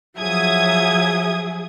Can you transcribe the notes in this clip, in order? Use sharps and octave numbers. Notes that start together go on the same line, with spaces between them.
F3 F#3 G#4 E5 D#6 G#6